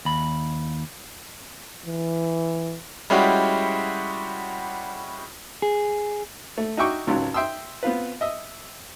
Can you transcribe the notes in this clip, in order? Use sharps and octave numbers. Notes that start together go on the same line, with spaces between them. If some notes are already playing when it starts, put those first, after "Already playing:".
D#2 B5
E3
G3 G#3 C#4 E4 F#4 G4
G#4
A3
D#4 F#4 E5 G5 C#6 D6
G#1 C#2 C#3 F#3
E5 G5 C6 D#6 E6
B3 C4 F4 B4
D#5 E5